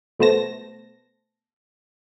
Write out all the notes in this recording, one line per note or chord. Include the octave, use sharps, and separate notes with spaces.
B2 A3 B3 C5 A5 A#6